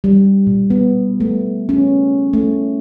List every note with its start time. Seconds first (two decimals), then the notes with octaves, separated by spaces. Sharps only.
0.04 G3
0.47 A#2
0.70 B3
1.20 A3
1.69 C#4
2.33 A3